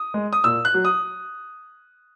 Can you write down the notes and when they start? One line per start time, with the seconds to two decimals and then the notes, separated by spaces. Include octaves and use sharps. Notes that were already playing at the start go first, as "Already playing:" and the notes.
Already playing: D#6
0.14 G#3
0.33 D#6
0.44 A#2 E6
0.65 F#6
0.74 F#3
0.85 D#6